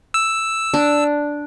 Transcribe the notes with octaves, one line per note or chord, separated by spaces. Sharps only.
E6
D4